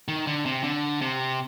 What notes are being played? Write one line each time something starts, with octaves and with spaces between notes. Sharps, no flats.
D#3
D3
C3
D3
C3